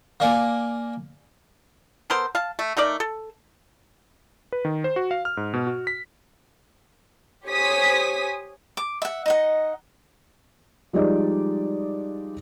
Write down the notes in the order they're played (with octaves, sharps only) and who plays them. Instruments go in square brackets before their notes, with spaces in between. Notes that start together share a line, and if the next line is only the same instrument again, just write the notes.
[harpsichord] A#3 D5 G#5
[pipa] B3 A4 A#4 C5
F5 A5
A3
A3 D#4 A#4 D5
A4
[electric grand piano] B4
D#3
C5
F#4
F5
F6
G#2
B2
F#4
B6
[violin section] G4 C5 C#5 G#5 D#6 B6
[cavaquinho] D6
E5 F#5
D#4 D#5 F#5
[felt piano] F3 G3 G#3 D#4 D5 D#5